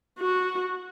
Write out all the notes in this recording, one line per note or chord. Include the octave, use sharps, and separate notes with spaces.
F#4